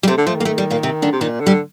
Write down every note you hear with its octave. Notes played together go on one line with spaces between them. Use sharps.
G3
C3 A3
D3
F3 A3
D#3 A#3
A3
G3
A#2 A#3
C3 C4
D3 D4
C3
A#2 D#3 D#4
D3
G3 G4